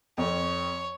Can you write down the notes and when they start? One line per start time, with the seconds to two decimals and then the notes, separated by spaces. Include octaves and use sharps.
0.18 F2 C#5